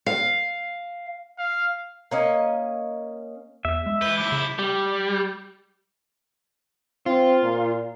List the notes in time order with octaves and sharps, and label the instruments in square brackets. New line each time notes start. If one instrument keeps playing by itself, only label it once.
[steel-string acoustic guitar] F5
[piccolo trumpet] F5
[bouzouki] A#3 C#4 D#5
[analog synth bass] E2 [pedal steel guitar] E5
[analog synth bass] G#3
[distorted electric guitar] E3 B4 [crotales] G6 G7
[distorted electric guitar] F#2 E4 [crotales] D6
[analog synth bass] C#3
[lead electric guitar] G3
[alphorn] C4 [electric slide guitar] F4
[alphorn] A#2